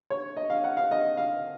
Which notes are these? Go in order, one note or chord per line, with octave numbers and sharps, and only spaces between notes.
C#5
D#5
F5
F#5
F5
D#5
F5